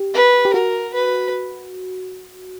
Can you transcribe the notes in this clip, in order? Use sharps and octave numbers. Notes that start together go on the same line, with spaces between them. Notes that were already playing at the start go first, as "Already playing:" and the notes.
Already playing: G4
B4
G4
F#4 A#4
B4